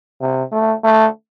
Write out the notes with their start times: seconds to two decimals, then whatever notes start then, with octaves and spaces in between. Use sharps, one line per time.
0.21 C3
0.52 A3
0.84 A3